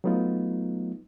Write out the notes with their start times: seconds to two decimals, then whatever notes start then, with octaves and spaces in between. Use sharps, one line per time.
0.04 F#3 A3 B3 D#4 F4